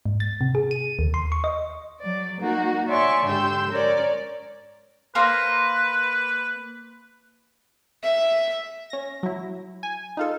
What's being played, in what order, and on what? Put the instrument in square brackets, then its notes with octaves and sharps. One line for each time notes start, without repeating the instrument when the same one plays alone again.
[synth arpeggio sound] G#2
A6
C3
G#4
D#7
D#2
C6
C#6
D#5
[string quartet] F#3 D5
A#3 D#4 F#4
C#5 D5 E5 G#5 C6 C#6
G#2 D3 G4 C6 E6 G6
C#4 A#4 C#5 D5
[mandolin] A#3 C5 A#5 [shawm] B4
[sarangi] E5
[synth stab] C#4 A#6
F#3 E4
G#5
D#4 F4 A4